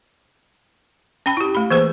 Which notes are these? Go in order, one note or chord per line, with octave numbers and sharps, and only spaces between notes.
C#4 G5 B5
E4 G4
A3 B5
E3 A#3 G#4 B4 C5